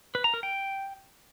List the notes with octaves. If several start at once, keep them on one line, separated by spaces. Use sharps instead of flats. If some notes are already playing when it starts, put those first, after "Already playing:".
B4
A#5
A#4
G5